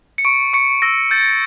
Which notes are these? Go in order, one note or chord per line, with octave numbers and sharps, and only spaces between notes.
C#7
C#6 D7
C#6 C#7
E6 A#6
G6 A6